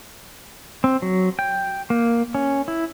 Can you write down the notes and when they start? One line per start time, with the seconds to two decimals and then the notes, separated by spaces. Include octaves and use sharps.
0.84 C4
1.02 F#3
1.39 G5
1.90 A#3
2.35 C#4
2.68 E4